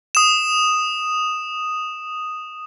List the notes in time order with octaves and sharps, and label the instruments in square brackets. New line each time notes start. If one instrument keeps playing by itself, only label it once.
[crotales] D#6 E7